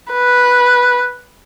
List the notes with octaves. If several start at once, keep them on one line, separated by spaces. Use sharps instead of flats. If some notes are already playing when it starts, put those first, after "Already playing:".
B4